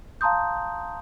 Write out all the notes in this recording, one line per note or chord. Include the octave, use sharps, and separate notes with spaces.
F5 A5 A#5 C6 D#6 G6